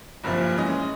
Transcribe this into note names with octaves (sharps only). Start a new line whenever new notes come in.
F#1 G2 A#2 F3 E5
E3 G#3 C#4 D#5